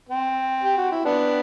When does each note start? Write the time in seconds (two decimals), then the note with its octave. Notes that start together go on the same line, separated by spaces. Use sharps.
0.09 C4
0.63 G4
0.78 F#4
0.92 E4
1.05 B3 D4